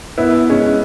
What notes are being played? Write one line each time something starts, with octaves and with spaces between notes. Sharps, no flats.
B3 E4
G#3 C#4